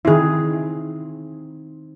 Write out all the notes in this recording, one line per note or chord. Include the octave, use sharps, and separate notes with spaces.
D#3 C4 E4 G#4